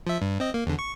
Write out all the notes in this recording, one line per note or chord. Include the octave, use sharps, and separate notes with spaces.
F3 E5
G2
C4 D#5
A#3
E2 D3
C#6